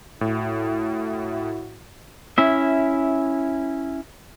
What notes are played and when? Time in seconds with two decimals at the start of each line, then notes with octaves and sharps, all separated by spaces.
0.21 A2 E4 F#4
2.38 C#4 E4 E5